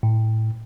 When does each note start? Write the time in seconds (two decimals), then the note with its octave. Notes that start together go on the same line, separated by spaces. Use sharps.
0.03 A2